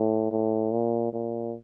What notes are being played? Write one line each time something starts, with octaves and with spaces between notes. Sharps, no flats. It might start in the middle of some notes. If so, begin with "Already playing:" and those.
Already playing: A2
A2
A#2
A#2